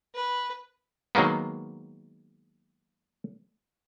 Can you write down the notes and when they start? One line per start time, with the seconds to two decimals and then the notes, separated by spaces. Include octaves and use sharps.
0.15 B4
1.15 D#3 F#3 G#3 A#3 B3